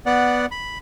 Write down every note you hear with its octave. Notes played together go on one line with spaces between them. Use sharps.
B3 D5 F#5
B5